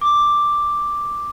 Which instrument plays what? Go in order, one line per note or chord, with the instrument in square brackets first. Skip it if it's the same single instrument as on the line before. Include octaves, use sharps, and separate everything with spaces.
[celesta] D6